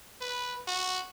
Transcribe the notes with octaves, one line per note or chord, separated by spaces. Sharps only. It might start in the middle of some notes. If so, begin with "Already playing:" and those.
B4
F#4